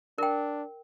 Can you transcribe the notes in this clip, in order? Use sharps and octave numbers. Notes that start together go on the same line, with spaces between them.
D4 A#4 G5